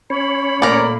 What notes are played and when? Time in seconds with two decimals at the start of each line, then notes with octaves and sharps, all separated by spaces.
0.10 C#4 C#5 B5
0.62 A#2 A3 A#3 A#4 D5